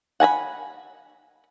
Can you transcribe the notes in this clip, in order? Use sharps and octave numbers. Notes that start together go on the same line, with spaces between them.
F#5 G#5 A#5 B5